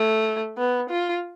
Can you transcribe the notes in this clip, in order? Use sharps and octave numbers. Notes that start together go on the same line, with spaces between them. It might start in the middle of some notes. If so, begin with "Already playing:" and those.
Already playing: A3
B3
F4